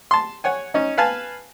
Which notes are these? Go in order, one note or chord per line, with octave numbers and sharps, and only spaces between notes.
A5 C6
C#5 F#5 G#5
C#4 D#4
B4 F5 G#5 A5